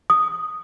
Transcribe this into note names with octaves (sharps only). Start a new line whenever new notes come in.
D#6